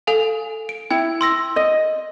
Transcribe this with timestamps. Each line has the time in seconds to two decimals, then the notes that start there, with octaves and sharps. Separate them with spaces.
0.07 A4 F5 G#5
0.69 D7
0.91 E4 G5
1.21 C6 E6 A#6
1.56 D#5